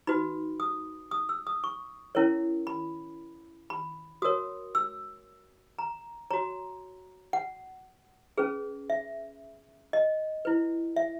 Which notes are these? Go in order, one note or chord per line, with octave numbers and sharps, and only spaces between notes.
D#4 F#4 B4 B5
D#6
D#6
E6
D#6
C#6
C#4 E4 A#4 C#5
B5
B5
F#4 A#4 C#5 D#6
E6
A#5
F#4 C#5 A#5
F#5
C#4 G#4 B4
E5
D#5
E4 B4
E5